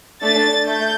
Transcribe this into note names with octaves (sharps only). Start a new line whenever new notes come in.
A3 D4 A4 A6
A3 G6